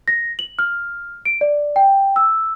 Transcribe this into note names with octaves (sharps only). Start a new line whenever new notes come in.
A#6
F#7
F6
D7
D5
G5
E6